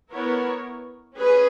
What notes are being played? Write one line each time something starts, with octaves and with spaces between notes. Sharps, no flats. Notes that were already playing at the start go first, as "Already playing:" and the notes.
B3 E4 A#4 C#5
C#4 G#4 B4